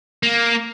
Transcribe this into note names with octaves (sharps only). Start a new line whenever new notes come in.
A#3